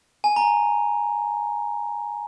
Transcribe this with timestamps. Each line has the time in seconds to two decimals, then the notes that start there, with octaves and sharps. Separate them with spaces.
0.24 G#5
0.36 A#5